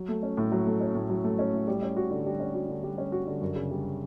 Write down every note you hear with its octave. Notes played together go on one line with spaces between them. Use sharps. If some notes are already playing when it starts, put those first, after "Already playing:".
Already playing: F#3
A3
C#4
A2
F#3
A3
C#4
A2
F#3
A3
C#4
A2
G3
C#4
F#4
D3
G3
C#4
F#4
D3
G3
C#4
F#4
D3
F#2
C#3
G3